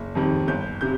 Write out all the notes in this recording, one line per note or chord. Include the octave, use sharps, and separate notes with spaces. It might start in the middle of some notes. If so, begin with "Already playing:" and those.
Already playing: F#1
F2 C3 D#3
G1 G6
C3 G6